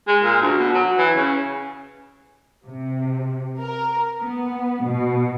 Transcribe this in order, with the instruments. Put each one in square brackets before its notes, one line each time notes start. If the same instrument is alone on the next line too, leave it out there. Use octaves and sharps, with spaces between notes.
[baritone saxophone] G#3
A#2
D2
B2
F#3
E3
C#3
[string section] C3
A#4
B3
B2